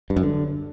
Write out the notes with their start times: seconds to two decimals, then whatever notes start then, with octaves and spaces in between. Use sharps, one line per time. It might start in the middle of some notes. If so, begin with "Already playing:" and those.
0.10 G2
0.16 F#2
0.23 D3